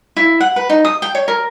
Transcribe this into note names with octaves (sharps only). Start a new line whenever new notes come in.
E4
F#5
B4
D#4
D#6
G5
C#5
A#4